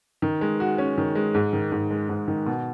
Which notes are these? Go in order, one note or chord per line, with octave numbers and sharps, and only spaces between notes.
D#3
G#3
F#4
C#4
D#3
G#3
G#2
D#3
G#2
G#3
G#2
D#3
B2